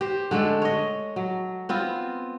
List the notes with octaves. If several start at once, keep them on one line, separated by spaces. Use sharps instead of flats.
G4 C5
D3 G#3 A3 A4
C#5 D#5
F#3
B3 C4 F4